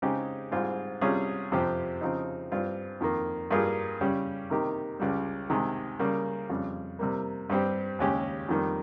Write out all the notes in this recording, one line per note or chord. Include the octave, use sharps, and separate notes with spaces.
C#3 G#3 C4 D#4 G4
G#2 G3 C4 F4 G#4
C3 G3 C#4 F4 G#4
F2 C3 F3 C4 G4
C#3 F3 C4 D#4
G2 G3 C4 F4
F2 D#3 A#3
G2 G3 A#3 F4 G#4
C#3 G3 C#4 G4
C3 D#3 A#3 D#4 G4
C#2 C#3 G3
C3 D#3 G#3
C#3 G3 A#3
F2 C#3 G3
C3 G3 A#3
G2 G3 C4 G4
D#2 C#3 G#3 C#4 G4
F2 D#3 G3 A#3